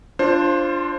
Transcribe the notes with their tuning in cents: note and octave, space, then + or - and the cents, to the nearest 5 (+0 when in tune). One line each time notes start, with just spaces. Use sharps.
D4 +0 F4 -20 C5 +20